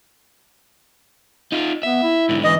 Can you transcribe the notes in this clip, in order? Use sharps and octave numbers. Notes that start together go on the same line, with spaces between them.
D#4 F4
B3 E5
E4
G#2 D3
E3 D#5